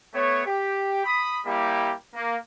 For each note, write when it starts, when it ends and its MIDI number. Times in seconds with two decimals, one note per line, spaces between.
0.14 0.46 57
0.14 0.46 59
0.14 0.46 73
0.47 1.04 67
1.05 1.41 83
1.05 1.41 87
1.46 1.93 55
1.46 1.93 58
1.46 1.93 64
1.46 1.93 67
2.15 2.36 58